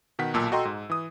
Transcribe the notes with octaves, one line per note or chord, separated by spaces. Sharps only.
B2 D#3 F#5 B6
B1 A#2 A5 E6
F#4 A4 D#5 G5 A#5 C6
G#2
E3 D#6